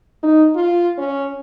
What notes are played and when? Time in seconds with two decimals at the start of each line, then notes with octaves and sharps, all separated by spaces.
0.23 D#4
0.56 F4
0.98 C#4